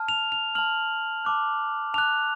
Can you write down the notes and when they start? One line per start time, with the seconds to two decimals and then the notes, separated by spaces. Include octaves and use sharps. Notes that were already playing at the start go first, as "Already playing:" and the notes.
Already playing: A5 F6
0.08 F7
0.32 F7
0.55 A5 F6 F#7
1.25 A5 D6 F#6
1.94 A5 D6 F#6 F7